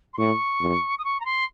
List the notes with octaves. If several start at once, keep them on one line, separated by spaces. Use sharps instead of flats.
C6
A2 C#6
F2
D#6
C#6
A#5
C6